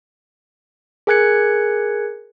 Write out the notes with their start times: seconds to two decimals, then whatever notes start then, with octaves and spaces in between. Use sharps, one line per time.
1.07 G#4 A#4 G#5 F#6 G#6 C#7